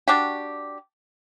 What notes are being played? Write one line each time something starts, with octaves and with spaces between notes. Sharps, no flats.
D4 F#4 G4